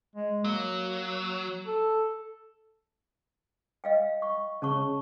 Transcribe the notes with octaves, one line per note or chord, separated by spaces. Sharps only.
G#3
F#3 A#3
A4
D#5 F5 G5
C#6
C#3 C#4 A5 C#6